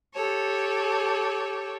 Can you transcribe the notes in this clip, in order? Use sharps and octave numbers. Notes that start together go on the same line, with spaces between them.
G4 A4 C#5